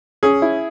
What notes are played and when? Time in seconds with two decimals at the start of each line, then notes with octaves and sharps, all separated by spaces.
0.23 C#4 G#4
0.42 E4